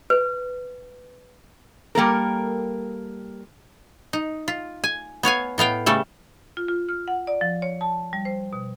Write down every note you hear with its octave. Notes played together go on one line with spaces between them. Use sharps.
B4
G3 A#3 A4 A#4
D#4
F4
G#5
B3 C#5 F5 G#5
A2 B3 F5 G5
C#3 G3 A3 A4
F4
F4
F6
F#5
D5
F3
C#5
A5
G3
C5
B2